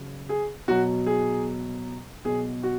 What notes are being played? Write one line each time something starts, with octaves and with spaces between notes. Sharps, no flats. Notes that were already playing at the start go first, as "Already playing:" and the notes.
Already playing: C#3 F#3
G#4
B2 F#3 F#4
G#4
B2 F#3 G#4
F#4